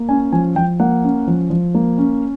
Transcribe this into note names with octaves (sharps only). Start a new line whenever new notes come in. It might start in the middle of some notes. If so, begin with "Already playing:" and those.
Already playing: A#3
C#4 G#5
F3 G#5
F3 G5
A#3 F#5
C#4
F3
F3
A#3
C#4